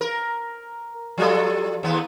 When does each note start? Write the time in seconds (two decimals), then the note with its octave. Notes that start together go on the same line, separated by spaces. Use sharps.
0.01 A#4
1.18 F3 G3 A4
1.83 D#2 B3